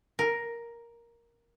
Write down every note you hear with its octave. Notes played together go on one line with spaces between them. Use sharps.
A#4